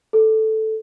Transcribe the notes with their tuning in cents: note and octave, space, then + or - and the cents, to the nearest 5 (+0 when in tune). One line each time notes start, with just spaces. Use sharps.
A4 -5